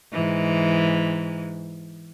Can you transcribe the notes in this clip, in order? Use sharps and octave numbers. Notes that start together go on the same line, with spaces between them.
G#2 E3